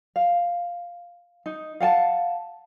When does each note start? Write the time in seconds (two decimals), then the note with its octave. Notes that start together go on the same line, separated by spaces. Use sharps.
0.16 F5
1.46 D#4
1.80 F5 F#5 G#5 A5